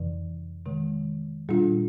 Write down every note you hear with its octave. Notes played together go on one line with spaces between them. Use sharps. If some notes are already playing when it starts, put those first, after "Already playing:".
Already playing: F2 C3 E3
C3 D#3 G#3
A#2 G3 B3 D4 F4